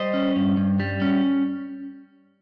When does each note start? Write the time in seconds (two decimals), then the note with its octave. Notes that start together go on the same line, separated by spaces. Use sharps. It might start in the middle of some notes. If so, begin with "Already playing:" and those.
Already playing: G3 C5 D#5
0.14 C#4
0.36 G2
0.57 G2
0.80 G3
1.02 C#4